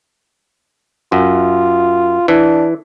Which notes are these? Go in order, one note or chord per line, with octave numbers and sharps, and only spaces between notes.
F#2 F4
E3 D4